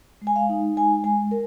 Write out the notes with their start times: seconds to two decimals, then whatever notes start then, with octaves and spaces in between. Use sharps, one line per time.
0.22 G#3
0.27 G#5
0.36 F5
0.49 D#4
0.77 G#3 G#5
1.04 G#3 G#5
1.31 A#4